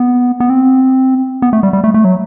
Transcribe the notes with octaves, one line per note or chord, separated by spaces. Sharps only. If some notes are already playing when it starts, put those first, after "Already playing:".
Already playing: B3
B3
C4
B3
A3
G3
G3
A3
A3
F#3